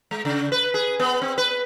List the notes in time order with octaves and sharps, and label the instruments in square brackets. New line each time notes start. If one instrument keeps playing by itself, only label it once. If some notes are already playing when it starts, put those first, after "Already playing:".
[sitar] G#3
C#3
B4
G#4
B3
C4
B4